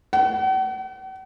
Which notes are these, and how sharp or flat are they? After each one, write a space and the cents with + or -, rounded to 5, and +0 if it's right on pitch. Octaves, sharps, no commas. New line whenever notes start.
F#5 +45